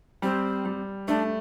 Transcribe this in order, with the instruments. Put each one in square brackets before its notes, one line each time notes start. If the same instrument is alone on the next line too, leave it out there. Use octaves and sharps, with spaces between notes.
[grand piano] G3 [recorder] C4
[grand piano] G3
[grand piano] A3 [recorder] D4